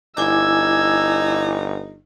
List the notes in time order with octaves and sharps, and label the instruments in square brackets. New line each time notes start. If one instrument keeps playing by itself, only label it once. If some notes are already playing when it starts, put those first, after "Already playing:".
[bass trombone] G1 [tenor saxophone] D#4 [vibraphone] E4 G#5 D6 [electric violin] E6 G#6